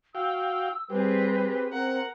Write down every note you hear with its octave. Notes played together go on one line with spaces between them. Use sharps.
F#4 F5 G5 E6
G3 C4 G4 G#4 B4
C4 A#4 F#5